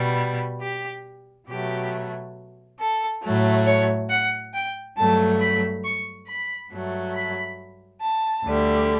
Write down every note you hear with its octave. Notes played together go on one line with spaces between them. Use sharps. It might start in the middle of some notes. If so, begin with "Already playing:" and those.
Already playing: B2 G3
G4
B2 F#3 A3 G4
A4
A2 F#3 A3
C#5
F#5
G5
G2 F#3 A3 A5
B5
C#6
B5
G2 F#3 A3
B5
A5
D2 D3 G3